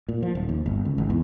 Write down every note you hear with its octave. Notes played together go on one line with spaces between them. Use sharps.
A#2
F3
D#1
D#2
G1
C#2
G#1
E2